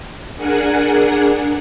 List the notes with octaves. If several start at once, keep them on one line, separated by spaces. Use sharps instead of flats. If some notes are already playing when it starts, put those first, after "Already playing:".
D4 G#4 A#4 F#5 G#5